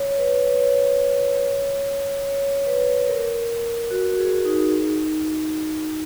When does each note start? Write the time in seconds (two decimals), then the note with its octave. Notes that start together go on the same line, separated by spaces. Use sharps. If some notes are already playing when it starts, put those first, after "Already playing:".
Already playing: C#5
0.18 B4
0.49 B4
0.60 C#5
2.25 C#5
2.66 B4
3.07 A#4
3.91 F#4
4.18 G#4
4.45 D#4
4.74 D#4